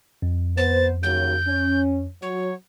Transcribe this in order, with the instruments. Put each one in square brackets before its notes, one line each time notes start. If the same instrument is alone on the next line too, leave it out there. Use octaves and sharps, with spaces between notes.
[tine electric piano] F2
[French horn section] B3 C5 [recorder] A6
[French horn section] D#2 C#3 F#3 [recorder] G6
[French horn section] C#4
[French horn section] F#3 [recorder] C#5